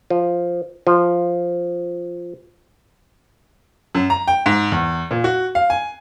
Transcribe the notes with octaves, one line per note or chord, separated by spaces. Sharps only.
F3
F3
F#2
A#5
G5
G#2
E2
A#2
F#4
F5
G#5